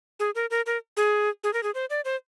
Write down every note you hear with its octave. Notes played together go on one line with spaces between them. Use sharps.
G#4
A#4
A#4
A#4
G#4
G#4
A#4
G#4
C5
D5
C5